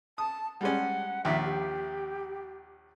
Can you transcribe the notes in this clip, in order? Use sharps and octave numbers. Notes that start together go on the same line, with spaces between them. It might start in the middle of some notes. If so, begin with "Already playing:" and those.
A5 D#6
G3 G#3 C#4 F#5
A#1 D#2 E5
G4